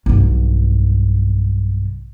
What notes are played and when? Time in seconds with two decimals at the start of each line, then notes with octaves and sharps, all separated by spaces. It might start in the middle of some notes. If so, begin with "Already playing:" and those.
0.06 B1 G2